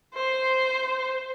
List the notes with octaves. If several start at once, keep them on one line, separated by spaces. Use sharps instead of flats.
C5